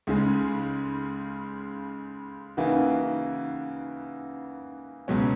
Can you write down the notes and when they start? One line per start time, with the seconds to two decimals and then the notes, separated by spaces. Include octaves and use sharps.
0.07 C#2 C#3 G#3
2.57 C#3 E3 A#3 D#4 F#4
5.08 C#2 B2 F#3 C#4